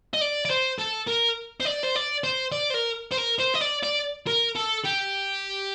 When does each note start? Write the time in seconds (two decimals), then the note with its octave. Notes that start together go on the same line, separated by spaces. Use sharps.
0.14 D#5
0.21 D5
0.45 D5
0.50 C5
0.79 A4
1.08 A#4
1.61 C5
1.65 D5
1.83 C5
1.95 D5
2.24 C5
2.52 D5
2.70 C5
2.74 A#4
3.12 C5
3.19 A#4
3.40 C5
3.55 D#5
3.61 D5
3.83 D5
4.27 A#4
4.56 A4
4.85 G4